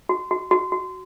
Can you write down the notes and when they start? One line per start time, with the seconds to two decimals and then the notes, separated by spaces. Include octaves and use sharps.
0.09 F#4
0.31 F#4
0.51 F#4
0.72 F#4